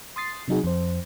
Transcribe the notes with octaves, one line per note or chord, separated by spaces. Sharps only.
C6 D#6 A6 C7
C3 F#3 D#4 F#4 G#4
F2 C5